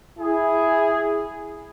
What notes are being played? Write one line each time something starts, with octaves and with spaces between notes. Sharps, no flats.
E4 G#4